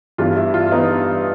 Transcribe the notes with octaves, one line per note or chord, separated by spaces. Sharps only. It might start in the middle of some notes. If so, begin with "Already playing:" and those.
G2 E3 G3 B3 F4
E4
F4
E3 G3 B3 D#4